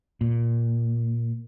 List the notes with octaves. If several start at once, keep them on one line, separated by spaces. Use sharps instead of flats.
A#2